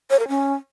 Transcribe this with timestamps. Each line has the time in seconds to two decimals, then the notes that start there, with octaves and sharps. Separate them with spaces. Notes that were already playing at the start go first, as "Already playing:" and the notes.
0.10 C#5
0.19 A#4
0.28 C#4